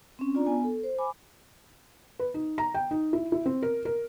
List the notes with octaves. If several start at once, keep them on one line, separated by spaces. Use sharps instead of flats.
C4 C#4
D4 F4 D5 A#5
B3 G#5
A4
C5
G#5 B5 D6
B4
D#4
A#5
G5
D#4
E4
E4
C4
A#4
A#4